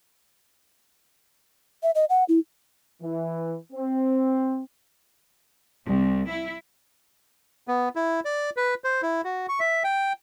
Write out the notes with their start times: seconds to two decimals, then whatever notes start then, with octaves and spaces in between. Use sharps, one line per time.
1.83 E5
1.95 D#5
2.10 F#5
2.29 E4
3.02 E3
3.73 C4
5.84 C2
6.29 E4
7.68 B3
7.96 E4
8.25 D5
8.57 B4
8.84 C5
9.02 E4
9.24 F#4
9.49 C#6
9.60 E5
9.84 G5